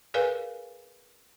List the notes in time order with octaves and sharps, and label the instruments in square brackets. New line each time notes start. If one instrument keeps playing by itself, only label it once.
[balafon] G#4 A#4 B4 D5 F5 G#5